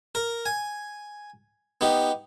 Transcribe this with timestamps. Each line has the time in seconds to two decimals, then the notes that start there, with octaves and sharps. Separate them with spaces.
0.15 A#4
0.46 G#5
1.81 B3 D#4 G4